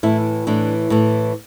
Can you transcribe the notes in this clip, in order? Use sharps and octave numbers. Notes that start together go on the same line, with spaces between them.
A2 E3 E4
A2 E3 D4
A2 E3